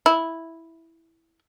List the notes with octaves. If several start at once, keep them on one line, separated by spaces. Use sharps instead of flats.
E4